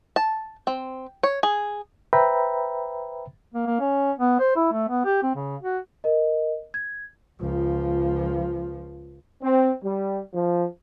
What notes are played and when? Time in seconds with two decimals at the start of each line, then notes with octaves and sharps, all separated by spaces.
0.16 A5
0.67 C4
1.23 C#5
1.43 G#4
2.13 B4 C5 E5 G5 A#5 B5
3.54 A#3
3.67 A#3
3.80 C#4
4.19 B3
4.39 C5
4.56 E4
4.72 A3
4.89 B3
5.05 G4
5.23 C4
5.35 C#3
5.62 F#4
6.04 A#4 D#5
6.74 G#6
7.41 C#2 F3
9.42 C4
9.84 G3
10.33 F3